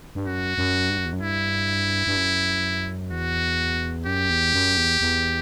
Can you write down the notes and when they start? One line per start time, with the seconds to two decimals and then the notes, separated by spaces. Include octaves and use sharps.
0.15 G2
0.26 F#2 F#4
0.58 F#2
0.90 G2
0.98 F#2
1.05 E2
1.13 F#2
1.21 G2 E4
2.07 G2
2.16 F#2
3.11 E2 F#4
4.06 F#2 G4
4.30 E2
4.54 F#2
4.77 E2
5.01 E2